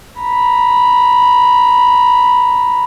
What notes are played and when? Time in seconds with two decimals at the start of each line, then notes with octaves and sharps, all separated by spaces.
0.21 A#5 B5